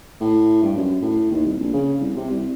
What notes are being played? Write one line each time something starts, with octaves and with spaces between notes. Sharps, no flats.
A2
G2
F#2
A2
D#2
C2
A#1
C#3
C2
C3
C2